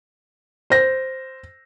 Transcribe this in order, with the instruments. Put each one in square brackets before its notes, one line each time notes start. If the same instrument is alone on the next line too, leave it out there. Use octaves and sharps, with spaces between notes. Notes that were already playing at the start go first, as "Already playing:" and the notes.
[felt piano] C5 A#6